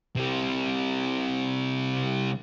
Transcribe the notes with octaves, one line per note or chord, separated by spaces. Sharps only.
C3 G3